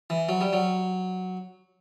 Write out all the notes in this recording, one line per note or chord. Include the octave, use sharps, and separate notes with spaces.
E3
F#3
G3
F#3